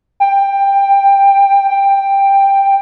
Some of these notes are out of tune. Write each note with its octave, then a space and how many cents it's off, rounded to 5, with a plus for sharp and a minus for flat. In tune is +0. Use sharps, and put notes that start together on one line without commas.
G5 +15
G5 +10